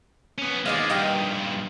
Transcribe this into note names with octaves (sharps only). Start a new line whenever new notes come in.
B3 C#4
D#2 G#3 D5 D#5 F5
G2 A#2 D#5 F5 G5